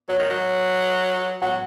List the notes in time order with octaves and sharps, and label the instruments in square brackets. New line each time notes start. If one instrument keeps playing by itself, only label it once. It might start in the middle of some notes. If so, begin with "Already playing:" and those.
[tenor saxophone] F#3 [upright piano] C#5
[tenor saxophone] D#3
F#3
[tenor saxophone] F#3 [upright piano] F#5